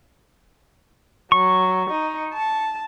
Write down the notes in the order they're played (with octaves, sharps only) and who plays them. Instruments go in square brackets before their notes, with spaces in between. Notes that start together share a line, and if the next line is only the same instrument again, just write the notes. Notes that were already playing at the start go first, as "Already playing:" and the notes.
[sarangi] F#3 [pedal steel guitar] C#6
[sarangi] D#4
A5